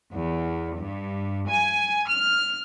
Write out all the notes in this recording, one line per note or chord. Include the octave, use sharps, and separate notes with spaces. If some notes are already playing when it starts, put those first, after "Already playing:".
E2
G2
G#5
F6